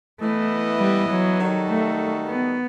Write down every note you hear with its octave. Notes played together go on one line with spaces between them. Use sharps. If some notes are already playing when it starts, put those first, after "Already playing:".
E3 A3 B3 E4 B4 D#5
G3
F#3
D#3 G3 D#4 F#4 A4
A3
B3